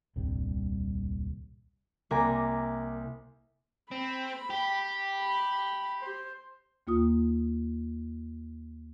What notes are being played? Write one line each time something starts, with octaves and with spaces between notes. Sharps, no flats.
D#1 C2 G2 C3
C2 A#3 G#5 A#5 D6
C4 B5
G4
B5
C5
D#2 A#3 F4 D#6